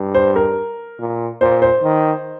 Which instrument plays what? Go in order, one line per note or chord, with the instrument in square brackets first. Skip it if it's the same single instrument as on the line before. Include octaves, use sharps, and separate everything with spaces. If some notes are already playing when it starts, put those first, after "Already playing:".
Already playing: [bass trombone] G2
[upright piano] C5
A#4
[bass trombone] A#2
[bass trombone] A#2 [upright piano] C5
[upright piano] C5
[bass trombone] D#3